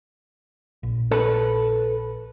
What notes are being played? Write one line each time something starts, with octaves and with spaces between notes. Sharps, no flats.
A#1
A4 B4